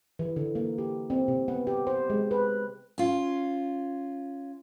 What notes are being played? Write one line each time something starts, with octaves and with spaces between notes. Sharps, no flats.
E3
D3
A#3
G4
C4
C3
B3
G4
C5
G#3
B4
C#4 F4